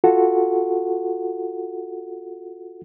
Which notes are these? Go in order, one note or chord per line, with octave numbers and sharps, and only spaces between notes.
F4 F#4 A4 F#5